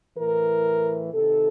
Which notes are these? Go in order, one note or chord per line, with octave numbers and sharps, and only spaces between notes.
A2 E3 A#4
C3 D#3 A4